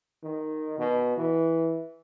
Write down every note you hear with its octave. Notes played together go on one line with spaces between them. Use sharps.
D#3
B2
E3